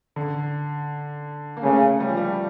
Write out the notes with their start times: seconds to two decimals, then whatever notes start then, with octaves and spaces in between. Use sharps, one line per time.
0.16 D3
1.57 A#3
1.63 C#3 A3
2.00 G3
2.08 F3
2.17 G3